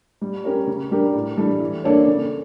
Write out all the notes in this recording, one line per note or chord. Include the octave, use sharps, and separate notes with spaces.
G3
C#4 G4 A#4 C#5
C#3
G3 D4 G4 A#4
A2
E3 G3 D4 A4
E3
A#3 D4 A4 C#5
C#3